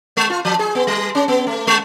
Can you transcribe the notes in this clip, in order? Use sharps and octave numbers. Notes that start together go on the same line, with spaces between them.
G#3
F4
F3
G#4
B3
G3
C#4
B3
A3
G#3